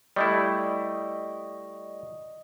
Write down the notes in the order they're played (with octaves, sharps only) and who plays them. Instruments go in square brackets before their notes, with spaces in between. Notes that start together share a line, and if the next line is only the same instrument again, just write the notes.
[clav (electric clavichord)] G3 A3 E4 [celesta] D5 C#6 [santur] D#5